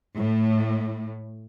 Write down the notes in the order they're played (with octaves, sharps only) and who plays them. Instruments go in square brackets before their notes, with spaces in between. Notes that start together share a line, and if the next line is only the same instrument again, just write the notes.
[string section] A2